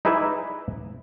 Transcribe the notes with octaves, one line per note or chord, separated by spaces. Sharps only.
D#4 E4 G#4 B4 D5 E5